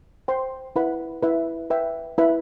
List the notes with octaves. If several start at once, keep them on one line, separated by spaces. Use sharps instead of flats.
C5 G5 C6
E4 B4 F#5 B5
E4 B4 E5
B4 E5 G5
E4 B4 E5 B5